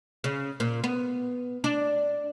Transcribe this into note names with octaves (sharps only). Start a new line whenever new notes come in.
C#3
A#2
B3
D4